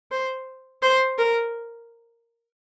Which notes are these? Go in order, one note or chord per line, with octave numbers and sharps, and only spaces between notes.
C5
C5
A#4